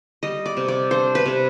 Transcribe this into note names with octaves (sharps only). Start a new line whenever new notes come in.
G3 D#5
D5
C3
D5
D4 C5
B4
C3